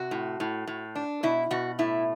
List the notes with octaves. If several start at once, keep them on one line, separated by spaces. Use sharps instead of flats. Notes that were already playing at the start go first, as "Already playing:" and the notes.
Already playing: C3 F#4
A2
A2
A2
D4
B2 E4
B2 F#4
A2 E4